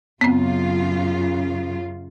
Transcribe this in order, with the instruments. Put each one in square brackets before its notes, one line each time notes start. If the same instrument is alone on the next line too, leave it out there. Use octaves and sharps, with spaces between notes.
[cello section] F#2 C#3 F4 [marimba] B3 C4